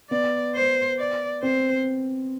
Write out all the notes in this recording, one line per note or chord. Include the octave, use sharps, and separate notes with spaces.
B3 D5
C5
D5
C4 C5